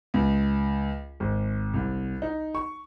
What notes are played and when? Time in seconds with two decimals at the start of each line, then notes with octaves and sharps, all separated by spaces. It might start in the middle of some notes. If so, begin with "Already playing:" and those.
0.14 C#2
1.20 G#1
1.74 C2
2.22 D#4
2.55 C#6